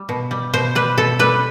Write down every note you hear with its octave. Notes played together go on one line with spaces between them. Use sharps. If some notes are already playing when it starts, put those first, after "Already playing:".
Already playing: G3
B2
G3
B2 C5
G3 B4
B2 A4
G3 B4